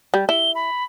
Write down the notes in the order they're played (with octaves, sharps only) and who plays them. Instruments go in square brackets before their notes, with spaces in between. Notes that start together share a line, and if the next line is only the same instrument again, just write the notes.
[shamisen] G3
[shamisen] E4 [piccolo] G7
[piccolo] B5